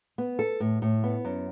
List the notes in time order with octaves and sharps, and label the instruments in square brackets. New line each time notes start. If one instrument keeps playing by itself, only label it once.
[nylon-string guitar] B3
A4
A2
A2
B3
F#2